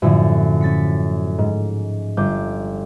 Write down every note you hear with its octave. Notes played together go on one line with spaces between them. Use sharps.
F#2 A2 D3 F3 F#3
C#4 A6 B6 C#7
G#2
G1 D6 G6